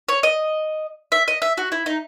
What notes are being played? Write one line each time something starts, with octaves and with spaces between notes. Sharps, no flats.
C#5
D#5
E5
D#5
E5
F#4
E4
D#4